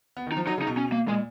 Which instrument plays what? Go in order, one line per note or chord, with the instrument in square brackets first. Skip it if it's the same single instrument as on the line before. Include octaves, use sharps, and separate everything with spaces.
[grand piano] B3
D#3
[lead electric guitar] D#4
[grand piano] F3
[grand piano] F#3 [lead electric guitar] D#4
[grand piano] C#3
[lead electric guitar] D#4
[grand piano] B2
[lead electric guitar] C#4
A#3
[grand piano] A#2 [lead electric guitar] G#3